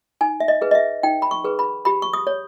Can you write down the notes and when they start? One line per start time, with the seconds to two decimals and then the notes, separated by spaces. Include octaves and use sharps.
0.21 D#4 G#5
0.40 E5
0.48 D#5
0.61 G#4 B4
0.71 D#5
0.75 E5
1.03 D#4 G5
1.22 B5
1.31 C#6
1.44 G#4 B4
1.59 B5
1.85 G4 B5
2.02 C#6
2.13 D#6
2.27 C#5